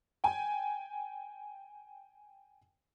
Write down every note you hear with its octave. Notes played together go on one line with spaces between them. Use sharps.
G5 G#5